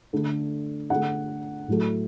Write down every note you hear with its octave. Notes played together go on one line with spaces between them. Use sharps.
D3 A3
D3 A3 F#5
A2 F#3 A3